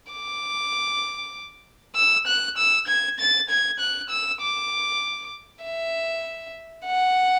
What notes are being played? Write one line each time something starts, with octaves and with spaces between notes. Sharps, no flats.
D6
E6
F#6
E6
G#6
A6
G#6
F#6
E6
D6
E5
F#5